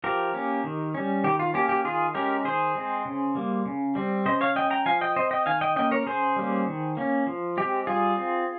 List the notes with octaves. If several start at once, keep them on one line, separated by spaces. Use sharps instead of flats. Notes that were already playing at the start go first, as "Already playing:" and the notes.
F3 G4 A#4
A#3 C#4
D#3
G3 C#4
D#3 G4
F4
A#3 C#4 G4
G4
D#3 F4 G#4
G#3 C#4 G4 A#4
D#3 G#4 C5
G#3 C4
C#3
G3 A#3
C#3
G3 C4
C#3 C5 D#5
C#5 F5
G#3 C#4 D#5 G5
G5 A#5
F3 F5 G#5
D#5 G5
C4 C5 D#5
D#5 G5
D#3 F5 G#5
D#5 G5
A#3 C#4 D#5 G5
A#4 C#5
C#3 G#4 C5
G3 A#3 C#4
D#3
A#3 C#4
F3
G#3 C4 G4
G3 F4 G#4
C4